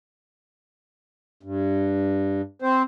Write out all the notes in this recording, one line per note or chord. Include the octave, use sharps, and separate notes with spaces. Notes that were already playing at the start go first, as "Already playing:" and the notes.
G2
C4 C5